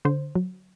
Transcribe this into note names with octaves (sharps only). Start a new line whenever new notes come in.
D3 C5
F#3